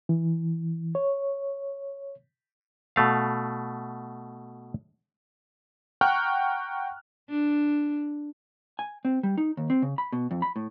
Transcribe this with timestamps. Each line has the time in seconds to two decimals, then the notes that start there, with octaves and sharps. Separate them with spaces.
0.09 E3
0.95 C#5
2.96 B2 A3 F5
6.01 F#5 G5 A#5 C#6 F6 F#6
7.29 D4
8.79 G#5
9.05 C4
9.23 G3
9.38 D#4
9.57 D#2
9.70 C4
9.82 C#3
9.98 B5
10.12 B2
10.31 F2
10.42 B5
10.56 A2